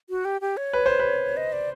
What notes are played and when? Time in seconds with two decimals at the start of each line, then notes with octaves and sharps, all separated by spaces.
0.10 F#4
0.25 G4
0.41 G4
0.57 C#5
0.73 B4
0.86 C5
0.99 B4
1.37 D#5
1.53 D5